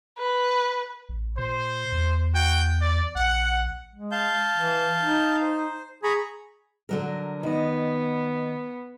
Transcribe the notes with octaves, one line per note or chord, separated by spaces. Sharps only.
B4
A1
A#2 C5
E2
F#4 G5
D5
A#1 F#5
G#3
F5 A5 G6
E3
D#4
C5
G#4 A#5 B5 C#6
D3 F#3 A#4
D#3 B3 D#5